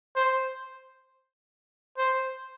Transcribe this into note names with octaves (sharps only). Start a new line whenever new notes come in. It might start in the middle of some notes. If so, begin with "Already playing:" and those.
C5
C5